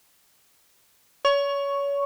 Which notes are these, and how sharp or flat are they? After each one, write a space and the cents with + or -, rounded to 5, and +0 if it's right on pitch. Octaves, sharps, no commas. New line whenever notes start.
C#5 +30 C#6 +0